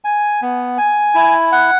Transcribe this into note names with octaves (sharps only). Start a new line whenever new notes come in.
G#5
B3
G#5
E4
F#5